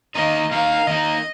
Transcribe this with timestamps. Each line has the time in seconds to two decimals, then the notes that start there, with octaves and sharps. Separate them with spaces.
0.15 D#3 A#3 D#4 D#5
0.51 D#3 A#3 D#4 F5
0.87 D#3 A#3 D#4 D#5